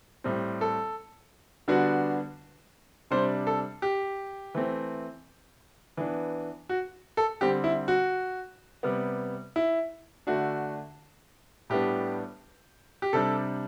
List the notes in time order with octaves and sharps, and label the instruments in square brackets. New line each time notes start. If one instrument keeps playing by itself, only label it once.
[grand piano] A2 G3 C4
A4
D3 G3 B3 D4 F#4
C3 G3 D4 C5
A4
G4
E3 A3 C4
E3 B3 D4
F#4
A4
D3 G3 C4 G4
E4
F#4
C3 G3 B3
E4
D3 A3 D4 F#4
A2 G3 B3 D4 G4
G4
C3 G3 D4 A4